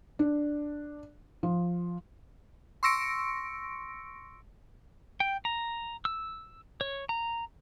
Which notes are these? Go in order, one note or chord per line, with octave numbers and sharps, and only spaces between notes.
D4
F3
C6 C#6 E6 A#6 C#7 D7
G5
A#5
E6
C#5
A#5